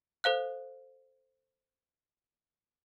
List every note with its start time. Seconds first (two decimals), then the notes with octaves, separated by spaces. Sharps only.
0.24 A4 C5 F5 F#6